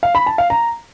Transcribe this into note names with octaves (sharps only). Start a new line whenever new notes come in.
F5
B5
A5
F5
A#5